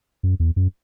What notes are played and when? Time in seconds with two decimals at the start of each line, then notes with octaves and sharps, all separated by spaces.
0.23 F#2
0.40 E2
0.56 F#2